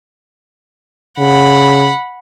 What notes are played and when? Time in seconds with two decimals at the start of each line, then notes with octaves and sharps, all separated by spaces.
1.19 C#3 F#5 B5